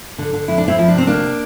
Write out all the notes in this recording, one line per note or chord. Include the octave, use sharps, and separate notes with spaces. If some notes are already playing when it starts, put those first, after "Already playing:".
D3
D3
F2 E4
D4
D3 C4 E4
F3 E4
D4
C3 C4
D2 A#3 D4